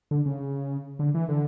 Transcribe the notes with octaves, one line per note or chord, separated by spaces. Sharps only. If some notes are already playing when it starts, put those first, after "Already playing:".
D3
C#3
D3
E3
D3